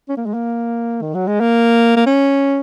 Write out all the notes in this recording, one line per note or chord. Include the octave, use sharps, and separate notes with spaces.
C#4
A#3
G#3
A#3
D#3
F#3
G#3
A#3
A#3
C#4